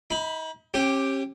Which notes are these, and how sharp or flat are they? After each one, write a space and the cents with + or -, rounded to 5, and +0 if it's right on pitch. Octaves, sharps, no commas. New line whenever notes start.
D#4 +40 B5 +0
C#4 -40 G4 +0